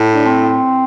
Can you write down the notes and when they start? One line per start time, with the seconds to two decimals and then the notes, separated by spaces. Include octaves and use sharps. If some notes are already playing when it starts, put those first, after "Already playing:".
Already playing: A2
0.14 D4
0.26 C4